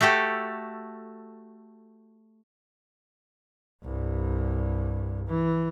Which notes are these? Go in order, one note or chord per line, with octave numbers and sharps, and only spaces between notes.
A3 F#4 G4 A4
C2 G2
E3